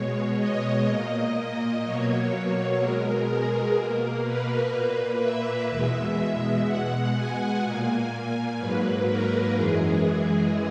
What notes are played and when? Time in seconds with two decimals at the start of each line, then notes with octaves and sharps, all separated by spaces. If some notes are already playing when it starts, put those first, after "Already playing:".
Already playing: B2 G#3 C#5
0.39 D#5
0.88 A#2 A#3
1.84 B2 F#3 A#3 C#5
2.80 B2 G#3 A#4
3.29 G#4
3.76 B2 A#3 A#4
4.25 B4
4.72 A#2 A#3 B4
5.21 E5
5.69 E2 B2 G#3
6.65 B2 G#3 F#5
7.14 G#5
7.62 A#2 A#3
8.58 G#2 F#3 A#3 B4
9.07 A#4
9.54 F#2 E3 G#3 G#4